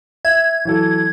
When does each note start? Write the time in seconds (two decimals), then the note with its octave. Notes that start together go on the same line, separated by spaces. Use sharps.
0.25 E5 G#6
0.65 E3 F#3 A4